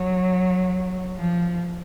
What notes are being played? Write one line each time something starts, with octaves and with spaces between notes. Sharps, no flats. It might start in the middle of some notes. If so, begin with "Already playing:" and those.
Already playing: F#3
F3